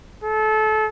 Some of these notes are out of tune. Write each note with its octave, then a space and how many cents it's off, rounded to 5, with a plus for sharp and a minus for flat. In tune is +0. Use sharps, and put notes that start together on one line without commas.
A4 -30